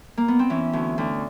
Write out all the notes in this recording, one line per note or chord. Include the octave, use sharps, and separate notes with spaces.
A#3
B3
C4
E3 C#4
D2
D2